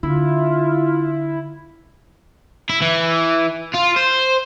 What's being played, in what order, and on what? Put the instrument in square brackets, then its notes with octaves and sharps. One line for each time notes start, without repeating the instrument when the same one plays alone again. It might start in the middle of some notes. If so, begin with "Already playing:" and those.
[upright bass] D3 [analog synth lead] E4 [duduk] F4
[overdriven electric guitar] E4
E3
F4
C5